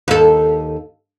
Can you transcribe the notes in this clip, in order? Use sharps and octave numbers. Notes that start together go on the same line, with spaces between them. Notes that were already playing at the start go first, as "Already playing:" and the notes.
D#2 A4